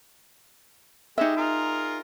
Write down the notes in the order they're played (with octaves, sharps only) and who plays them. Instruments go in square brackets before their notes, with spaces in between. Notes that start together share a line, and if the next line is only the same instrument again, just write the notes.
[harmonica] G#3 G4 [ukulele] D#4 E5
[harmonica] F4 G#4 A#4